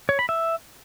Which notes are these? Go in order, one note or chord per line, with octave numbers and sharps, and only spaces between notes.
C#5
B5
E5